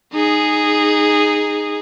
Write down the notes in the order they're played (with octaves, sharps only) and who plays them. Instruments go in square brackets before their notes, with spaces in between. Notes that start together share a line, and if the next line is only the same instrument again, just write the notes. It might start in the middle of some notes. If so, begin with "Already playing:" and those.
[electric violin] D#4 G#4